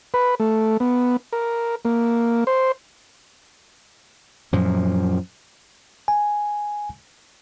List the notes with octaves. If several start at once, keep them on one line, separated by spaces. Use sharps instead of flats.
B4
A3
B3
A#4
A#3
C5
F#2 A#2 F3
G#5